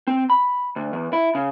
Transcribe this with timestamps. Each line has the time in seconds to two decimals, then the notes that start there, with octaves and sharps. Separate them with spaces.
0.07 C4
0.30 B5
0.76 D2
0.93 E2
1.13 E4
1.35 C#3